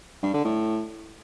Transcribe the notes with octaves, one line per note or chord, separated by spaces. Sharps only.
G2
D3
A2